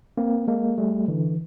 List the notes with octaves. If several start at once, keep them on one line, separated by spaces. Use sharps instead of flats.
A#3 C4
G#3 A#3
G3 A3
D3 E3